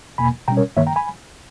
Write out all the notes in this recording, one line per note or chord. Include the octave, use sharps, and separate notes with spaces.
E2 B2 A#3 G#5 B5
B2 G3 C#4 G5 A#5
A#4 C#5
G2 D#3 A#3 C#5 E5
G5 A#5
G#5 B5